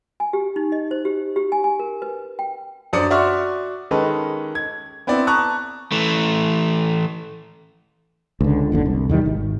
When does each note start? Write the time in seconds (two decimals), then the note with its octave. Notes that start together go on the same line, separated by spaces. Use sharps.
0.20 G#5
0.33 G4
0.56 D#4
0.72 D#5
0.91 C5
1.05 G4
1.36 G4
1.52 G#5
1.64 G#5
1.79 A#4
2.02 B4
2.39 G5
2.93 F#2 D4 C5 D5 D#6 C#7
3.10 F#4 D5 E5 C6 C#6 F6
3.91 D#3 G#3 C#4 A4 B4
4.55 G#6
5.07 B3 C4 E4 D5
5.27 A5 A#5 C#6 D#6 F#6
5.92 E3 A3
8.41 C#2 D3
8.72 F#1 D#2 D3
8.85 C2
9.09 E2 D#3 F3 G3
9.26 G#1